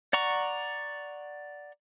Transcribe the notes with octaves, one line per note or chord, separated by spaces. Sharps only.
D5 F#5 A#5 C#6